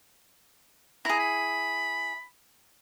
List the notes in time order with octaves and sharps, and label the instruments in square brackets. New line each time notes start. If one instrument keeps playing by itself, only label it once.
[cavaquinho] E4 G#4 [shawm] A#5
[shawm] B5